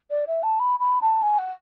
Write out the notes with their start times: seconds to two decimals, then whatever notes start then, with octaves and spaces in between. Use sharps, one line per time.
0.10 D5
0.27 E5
0.43 A5
0.59 B5
0.79 B5
1.01 A5
1.22 G#5
1.38 F#5